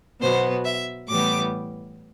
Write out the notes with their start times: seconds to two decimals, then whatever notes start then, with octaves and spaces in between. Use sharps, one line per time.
0.21 B2 F#3 B3 C5
0.65 E5
1.09 A2 E3 G3 B3 D6